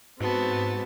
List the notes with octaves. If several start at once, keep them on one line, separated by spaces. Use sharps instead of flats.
G#2 B3 C4 F#4 A5